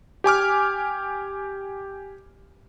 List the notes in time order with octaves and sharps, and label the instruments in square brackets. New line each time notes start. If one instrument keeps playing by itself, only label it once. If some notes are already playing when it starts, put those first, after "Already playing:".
[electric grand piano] G4 G#5 D6 F6